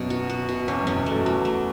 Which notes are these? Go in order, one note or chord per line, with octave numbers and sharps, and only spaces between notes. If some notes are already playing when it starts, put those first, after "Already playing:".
Already playing: F#2 B2 C#4
F#4
F#4
B2
E2 C#4
F#2 C#4
E2
A3
F#2
E2 F#3
A3